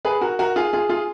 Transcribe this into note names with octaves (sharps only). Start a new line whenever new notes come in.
G#4 B4
F#4 A#4
F#4 A#4
F4 G#4
F4 G#4
F4 G#4